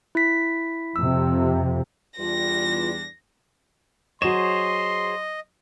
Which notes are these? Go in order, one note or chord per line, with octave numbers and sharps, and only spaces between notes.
E4 B6
F2 C3 E6
E2 G3 D4 F4 A#6
F#3 G#4 C5 C#5 D#5 C6 E7